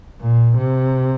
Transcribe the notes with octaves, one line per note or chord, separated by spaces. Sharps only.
A#2
C3